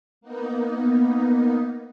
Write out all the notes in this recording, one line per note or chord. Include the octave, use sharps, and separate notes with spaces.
A#3 B3 D#4